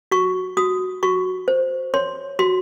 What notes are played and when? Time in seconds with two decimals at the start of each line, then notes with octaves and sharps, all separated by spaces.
0.11 F#4 C#6
0.57 F#4 D#6
1.03 F#4 C#6
1.48 C5
1.94 C#5 C6
2.39 F#4 C6